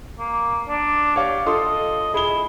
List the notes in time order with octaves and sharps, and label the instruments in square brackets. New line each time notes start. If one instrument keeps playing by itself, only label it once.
[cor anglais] A#3
D4
[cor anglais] G4 [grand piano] C#5 F5
[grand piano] F4 A4 C6 [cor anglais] D#5
[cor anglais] E4 [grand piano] G#4 G7